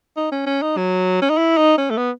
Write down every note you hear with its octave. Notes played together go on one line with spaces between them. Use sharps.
D#4
C#4
C#4
D#4
F#3
C#4
D#4
E4
D#4
C#4
A3
B3